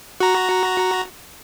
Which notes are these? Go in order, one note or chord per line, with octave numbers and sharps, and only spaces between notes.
F#4 A#5